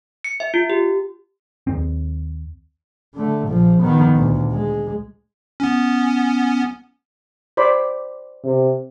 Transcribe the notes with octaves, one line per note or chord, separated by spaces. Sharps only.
C#7
E5
F4
G4
D#2 C4
D3 A3
A#1 F3
D#3 B3
D2 A#2
G#3
B3 C#4
C5 D5 B5
C3